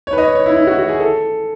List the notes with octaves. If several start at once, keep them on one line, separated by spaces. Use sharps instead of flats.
C#5
B4
D#5
C#5
C#5
E4
E4
F#4
F#4
G#4
A4